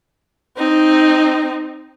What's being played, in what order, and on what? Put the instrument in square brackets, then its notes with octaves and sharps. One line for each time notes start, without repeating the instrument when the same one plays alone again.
[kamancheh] C4 D#4